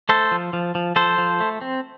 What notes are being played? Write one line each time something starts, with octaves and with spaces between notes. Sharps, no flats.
A3 A4 C5
F3
F3
F3
F3 A4 C5
F3
A3
C4